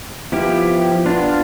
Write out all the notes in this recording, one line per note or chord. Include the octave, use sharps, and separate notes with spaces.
F3 B3 E4 G4
B3 D4 F4